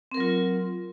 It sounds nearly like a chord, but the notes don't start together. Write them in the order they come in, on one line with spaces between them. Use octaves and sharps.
C4 A#4 F#3 F4